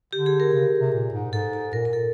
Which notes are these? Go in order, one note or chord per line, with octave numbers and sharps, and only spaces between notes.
D3 G4
G#4
A#4
C#3
C3
A#2
G#2
G#2 A4
A4
A#2 A#4
A#4
A4